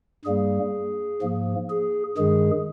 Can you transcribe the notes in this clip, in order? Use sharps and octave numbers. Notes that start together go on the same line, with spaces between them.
G2 G3 A#3 G#4
G#2 F3 A#3
G#4
G2 D#3 G#3 G#4